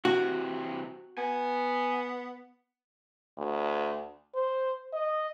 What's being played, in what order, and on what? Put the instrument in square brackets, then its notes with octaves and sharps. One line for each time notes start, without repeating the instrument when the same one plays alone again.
[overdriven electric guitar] C3 E3 [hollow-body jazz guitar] F#4
[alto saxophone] B3 [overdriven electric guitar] G#5
[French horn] D2
C5
D#5